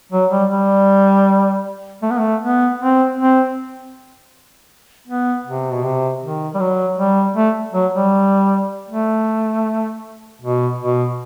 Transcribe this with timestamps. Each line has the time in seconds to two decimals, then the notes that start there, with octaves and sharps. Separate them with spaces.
0.12 F#3
0.31 G3
0.50 G3
2.02 A3
2.11 B3
2.19 A3
2.40 B3
2.79 C4
3.17 C4
5.07 B3
5.46 C3
5.73 B2
5.84 C3
6.22 D#3
6.54 G3
6.60 F#3
6.98 G3
7.36 A3
7.74 F#3
7.94 G3
8.89 A3
10.42 B2
10.79 B2